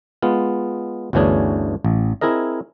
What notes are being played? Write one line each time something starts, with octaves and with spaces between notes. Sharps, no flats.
G#3 B3 F4
G1 D2 E3 C#4 D4 G#4
A1
C4 E4 G#4 A#4 D#5